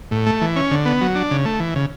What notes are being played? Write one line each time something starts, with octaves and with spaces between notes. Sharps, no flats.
A2
A3
E3
C#4
D3
B3
F#3
D4
C#3
A3
E3
C#3